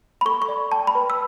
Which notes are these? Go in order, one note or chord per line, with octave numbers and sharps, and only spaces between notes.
B5
A4 C#6
C#6
D5
G5 A5
B5
B4
E6